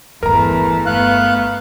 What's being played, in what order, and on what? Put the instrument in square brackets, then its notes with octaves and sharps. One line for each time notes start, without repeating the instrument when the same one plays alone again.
[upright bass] G1 G2 [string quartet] E2 A3 [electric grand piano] A#4 A#5
[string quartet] A3 B3 [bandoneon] F5 F#6